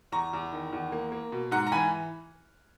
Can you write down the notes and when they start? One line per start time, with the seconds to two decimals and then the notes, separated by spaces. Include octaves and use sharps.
0.12 E2 A#5 C#6
0.33 E2
0.53 D#3
0.73 E2
0.92 A#3
1.12 A#3
1.32 B2
1.51 G#2 F#5 A#5
1.67 A#5
1.72 E3 G#5 B5